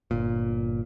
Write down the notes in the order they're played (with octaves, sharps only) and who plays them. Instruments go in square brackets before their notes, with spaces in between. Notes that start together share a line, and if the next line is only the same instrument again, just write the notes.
[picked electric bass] G1 A#2